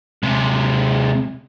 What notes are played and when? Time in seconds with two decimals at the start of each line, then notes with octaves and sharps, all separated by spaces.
0.23 C3 G#3